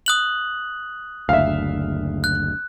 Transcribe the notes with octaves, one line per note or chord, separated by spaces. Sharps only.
D#6 F#6 F#7
F#1 D2 E5 F5
F#6